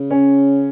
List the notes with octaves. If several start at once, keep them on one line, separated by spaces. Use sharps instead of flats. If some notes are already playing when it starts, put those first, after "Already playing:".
Already playing: C#3
C#4